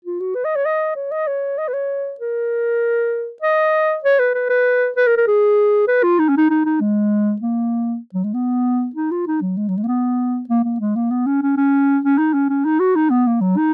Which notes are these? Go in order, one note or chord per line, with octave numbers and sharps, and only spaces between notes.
F4
F#4
B4
D#5
C#5
D#5
C#5
D#5
C#5
D#5
B4
C#5
A#4
D#5
C#5
B4
B4
B4
B4
A#4
A#4
G#4
B4
F4
D#4
C#4
D#4
D#4
D#4
G#3
A#3
F#3
G#3
B3
D#4
F4
D#4
F#3
G#3
F#3
G#3
A#3
B3
A#3
A#3
G#3
A#3
B3
C#4
C#4
C#4
C#4
D#4
C#4
C#4
D#4
F#4
D#4
B3
A#3
F#3
D#4